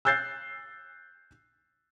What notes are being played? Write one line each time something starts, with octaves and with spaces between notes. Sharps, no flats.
E6 F#6 G6 A6 C7